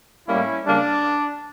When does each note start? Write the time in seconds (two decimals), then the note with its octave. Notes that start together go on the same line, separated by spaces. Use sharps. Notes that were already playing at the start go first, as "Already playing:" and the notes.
0.28 A2 G3 A#3 C#4 E4
0.65 C#3 G3 A#3 D4